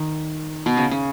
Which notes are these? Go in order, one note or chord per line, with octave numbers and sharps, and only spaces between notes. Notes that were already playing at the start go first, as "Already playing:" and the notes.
Already playing: D#3
B2
C#3
C#3